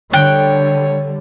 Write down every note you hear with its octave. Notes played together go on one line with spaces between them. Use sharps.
D3 G3 C#5 G5 F#6